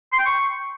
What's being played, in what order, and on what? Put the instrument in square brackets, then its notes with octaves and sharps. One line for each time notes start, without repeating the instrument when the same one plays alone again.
[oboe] C6
G5
C#6